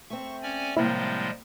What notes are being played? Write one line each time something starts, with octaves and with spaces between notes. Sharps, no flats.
A3 C4 C#6
C#4 D5 G#5
A2 C3 F3 G3 G#3 A#3 E4